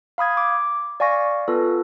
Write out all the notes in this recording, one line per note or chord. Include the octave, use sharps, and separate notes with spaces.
F5 B5 D#6 G#6
D6
D5 F5 G#5 C#6 A#6
B3 F4 A4 B4